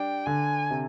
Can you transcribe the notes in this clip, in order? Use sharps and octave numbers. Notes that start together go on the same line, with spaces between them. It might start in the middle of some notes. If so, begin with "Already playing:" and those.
Already playing: G3 D4 G5
D3 G#5
C3